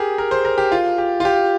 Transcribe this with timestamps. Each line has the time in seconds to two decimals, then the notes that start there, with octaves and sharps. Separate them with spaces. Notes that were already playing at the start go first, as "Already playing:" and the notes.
Already playing: G4 G#4 A#4
0.18 A#4
0.31 C5
0.45 A#4
0.58 G4
0.72 F4
0.98 G4
1.20 F4
1.25 G4